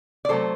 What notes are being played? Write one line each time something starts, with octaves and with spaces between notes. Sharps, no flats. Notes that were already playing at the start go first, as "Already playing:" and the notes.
D5
C3 F#3 A3 A4 C5